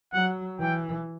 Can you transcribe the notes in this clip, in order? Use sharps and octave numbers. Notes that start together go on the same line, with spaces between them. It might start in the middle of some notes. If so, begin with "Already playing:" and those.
F#3 F#5
E3 G5